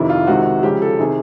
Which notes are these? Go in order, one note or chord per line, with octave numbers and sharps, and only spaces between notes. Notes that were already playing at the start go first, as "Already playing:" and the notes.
Already playing: F2 C3 D#3 E4
F4
C#2 C3 D#3 F#4
C#2 C#3 F3 G4
A4
C3 D#3 G#4